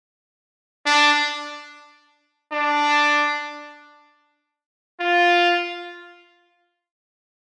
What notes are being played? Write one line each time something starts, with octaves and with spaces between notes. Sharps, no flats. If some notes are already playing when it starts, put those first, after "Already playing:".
D4
D4
F4